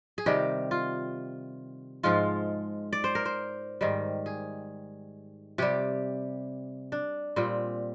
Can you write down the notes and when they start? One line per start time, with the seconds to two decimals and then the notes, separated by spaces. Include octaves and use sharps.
0.18 G#4
0.26 C3 D#3 G3 G4
0.71 F4
2.03 G#2 F3 G#3 F4
2.93 D5
3.04 C5
3.15 A#4
3.25 C5
3.81 G#2 D#3 G3
4.26 G#4
5.58 C3 G3 G4
6.92 D4
7.36 A#2 G3 C4